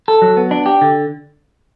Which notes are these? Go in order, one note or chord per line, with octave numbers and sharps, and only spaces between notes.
A4
F#3
B3
D4
G4
D3